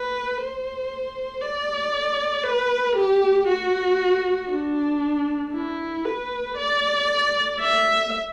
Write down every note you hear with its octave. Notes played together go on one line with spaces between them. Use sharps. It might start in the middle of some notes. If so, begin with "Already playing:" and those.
Already playing: B4
C5
D5
B4
G4
F#4
D4
E4
B4
D5
E5